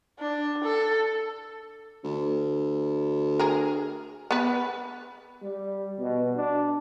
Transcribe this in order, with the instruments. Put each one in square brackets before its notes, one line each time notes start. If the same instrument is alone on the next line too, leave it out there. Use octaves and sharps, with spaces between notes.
[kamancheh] D4
A4
[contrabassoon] D2
[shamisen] G#4 A#4
B3 B4
[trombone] G3
B2
D4